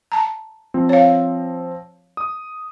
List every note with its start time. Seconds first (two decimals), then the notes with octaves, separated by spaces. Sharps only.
0.12 A5 A#5
0.74 F3 C4
0.89 C#5 F5
2.17 D#6